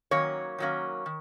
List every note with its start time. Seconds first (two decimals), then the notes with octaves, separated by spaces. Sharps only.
0.11 D#3 F#3 A#3 C#4 C#5
0.58 D#3 F#3 A#3 C#4
1.06 D#3